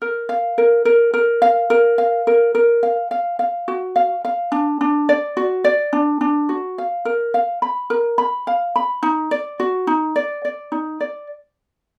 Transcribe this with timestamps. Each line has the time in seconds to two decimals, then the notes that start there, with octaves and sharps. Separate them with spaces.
0.02 A#4
0.29 F5
0.58 A#4
0.85 A#4
1.14 A#4
1.42 F5
1.70 A#4
1.98 F5
2.27 A#4
2.55 A#4
2.83 F5
3.11 F5
3.39 F5
3.68 F#4
3.96 F5
4.25 F5
4.52 D4
4.81 D4
5.09 D5
5.37 F#4
5.64 D5
5.93 D4
6.21 D4
6.49 F#4
6.78 F5
7.05 A#4
7.34 F5
7.62 B5
7.90 A#4
8.18 B5
8.47 F5
8.76 B5
9.03 D#4
9.31 D5
9.60 F#4
9.87 D#4
10.16 D5
10.45 D5
10.72 D#4
11.00 D5